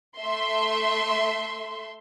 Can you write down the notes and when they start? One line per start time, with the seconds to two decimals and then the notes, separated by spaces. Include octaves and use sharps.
0.17 A3 E5 C6